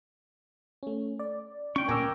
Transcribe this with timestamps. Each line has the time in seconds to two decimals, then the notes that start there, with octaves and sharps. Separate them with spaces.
0.83 A3 C#4
1.19 D5
1.76 C#4 G5 C#6
1.88 D1 A#2 C#4 A#4 G#5 D6 E6